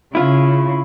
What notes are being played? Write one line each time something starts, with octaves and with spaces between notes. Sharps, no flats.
C#3 E4 F4